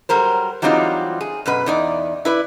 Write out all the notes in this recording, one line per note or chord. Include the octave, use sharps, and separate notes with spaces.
F#3 G3 A#4 C5
E3 F#3 G3 C4 D#4 F4
G#4
F#2 B2 B4
E2 D#4 D5
E4 B4 D5